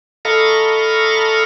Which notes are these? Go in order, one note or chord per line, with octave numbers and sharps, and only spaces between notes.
A4 D#5 F5 A#5 B5 C#6